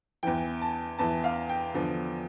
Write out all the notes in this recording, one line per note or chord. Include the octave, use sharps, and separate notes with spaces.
E2 E3 G5
A5
E2 E3 A5
F5
G5
E2 D3 F3